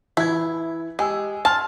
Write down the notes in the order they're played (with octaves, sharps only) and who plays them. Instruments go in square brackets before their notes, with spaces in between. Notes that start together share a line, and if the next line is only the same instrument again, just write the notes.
[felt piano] E3 G#6 [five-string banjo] E4
[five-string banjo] G#3 [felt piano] G4 G#5 E6
[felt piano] G#5 C6 F6 [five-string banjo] A5